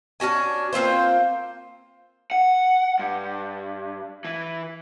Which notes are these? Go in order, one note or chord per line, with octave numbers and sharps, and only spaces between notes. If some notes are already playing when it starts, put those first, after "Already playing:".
C#4 D4 F#4 G#5
A#3 C4 F4 C5
F#5
G2
E3